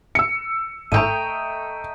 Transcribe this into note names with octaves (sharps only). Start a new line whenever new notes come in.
E6 C#7
G#1 A2 A3 D#5 G5 A#5 G6 D#7